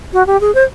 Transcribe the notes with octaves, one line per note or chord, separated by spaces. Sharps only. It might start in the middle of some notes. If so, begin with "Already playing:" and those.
F#4
G4
G#4
C5